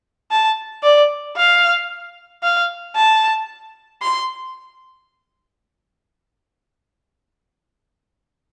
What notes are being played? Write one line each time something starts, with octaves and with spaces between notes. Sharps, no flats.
A5
D5
F5
F5
A5
C6